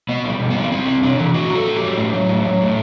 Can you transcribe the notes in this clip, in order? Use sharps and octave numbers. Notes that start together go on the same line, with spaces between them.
B2 B3
G3
B2
B3
G3
G3 C4
C3
C3 D4
E3
A2 F#4
F#3
A4
A2
F#3 G4
A2
F#3
A2
F#3
A2